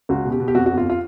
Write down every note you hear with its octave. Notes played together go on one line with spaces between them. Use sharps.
C#2 F#4
B2
G4
B2
G4
F2 F#4
F#4
G1
F4
F4